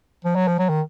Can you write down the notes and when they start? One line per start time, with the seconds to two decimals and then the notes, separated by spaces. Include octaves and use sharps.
0.25 F3
0.35 F#3
0.48 F3
0.59 F#3
0.69 D#3